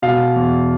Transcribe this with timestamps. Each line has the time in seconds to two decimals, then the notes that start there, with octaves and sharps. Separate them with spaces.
0.02 B2 F5
0.36 E2